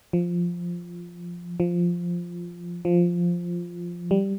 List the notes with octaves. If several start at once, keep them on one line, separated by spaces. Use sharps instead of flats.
F3
F3
F3
G3